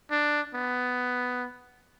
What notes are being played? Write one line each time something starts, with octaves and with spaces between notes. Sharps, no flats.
D4
B3